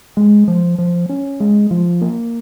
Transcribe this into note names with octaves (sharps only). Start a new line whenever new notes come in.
G#3
F3
F3
C#4
G#3
F3
A#3